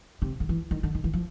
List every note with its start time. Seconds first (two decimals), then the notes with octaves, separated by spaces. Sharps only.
0.22 C3
0.40 D3
0.49 E3
0.71 D#3
0.83 D3
0.95 D#3
1.04 E3
1.13 F3